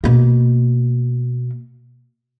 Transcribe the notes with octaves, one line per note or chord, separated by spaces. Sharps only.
B2 A#3